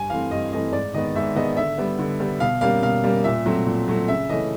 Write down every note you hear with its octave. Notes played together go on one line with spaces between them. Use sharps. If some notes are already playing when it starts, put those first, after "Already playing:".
Already playing: G2 G#5
E3 A3 C4 F5
G2 D#5
E3 A3 C4 D#5
G#2 D5
D#3 G#3 B3 D#5
G#2 E5
D#3 G#3 B3 D#5
D3 E5
G3 B3
D3
G3 B3
B2 F5
G3 A#3 C#4 F5
B2 F5
G3 A#3 C#4
A#2 E5
F#3 A3 C4
A#2
F#3 A3 C4
C#3 E5
E3 A3 C#4 D#5